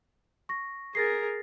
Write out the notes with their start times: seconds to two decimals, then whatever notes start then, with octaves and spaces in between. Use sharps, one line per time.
0.49 C#6 A#6
0.95 G#4 A#4 A6 A#6 C7